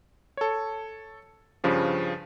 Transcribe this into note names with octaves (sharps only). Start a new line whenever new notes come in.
A4 C#5
G2 C#3 F3 G3